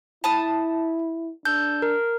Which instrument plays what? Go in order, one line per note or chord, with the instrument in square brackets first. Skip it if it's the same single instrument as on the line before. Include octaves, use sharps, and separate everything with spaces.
[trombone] E4 [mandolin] A5 B5 D#6
[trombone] D4 [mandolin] A4 [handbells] G6
[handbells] A#4